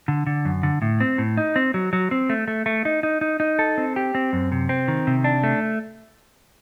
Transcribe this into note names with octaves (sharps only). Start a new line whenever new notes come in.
D3
D3
F#2
D3
A2
C4
A2
D#4
C4
F#3
F#3
C4
A3
A3
A3
D#4
D#4
D#4
D#4
A4
C4
G4
C4
F#2
C3
C4
D#3
C3
D4
A3